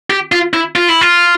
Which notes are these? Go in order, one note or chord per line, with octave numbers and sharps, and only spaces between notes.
G4
F4
E4
F4
E4
F4